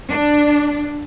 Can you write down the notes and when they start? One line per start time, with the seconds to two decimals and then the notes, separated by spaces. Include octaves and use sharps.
0.10 D4